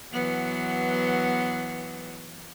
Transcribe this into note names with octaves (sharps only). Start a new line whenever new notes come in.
E3 F#3 B3